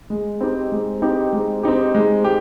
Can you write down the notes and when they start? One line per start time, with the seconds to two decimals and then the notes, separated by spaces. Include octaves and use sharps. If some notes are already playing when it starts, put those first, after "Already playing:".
0.10 G#3
0.41 C4 D#4 G4
0.72 G#3
1.02 C4 D#4 G4
1.33 G#3
1.63 C4 D#4 G4
1.95 G#3
2.24 G4